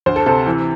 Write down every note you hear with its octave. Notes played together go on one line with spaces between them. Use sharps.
D2 C5
A4
C3 A4
E3